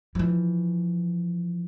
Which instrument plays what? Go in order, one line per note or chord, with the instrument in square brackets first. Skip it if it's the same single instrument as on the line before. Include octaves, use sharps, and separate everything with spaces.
[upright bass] E3 F3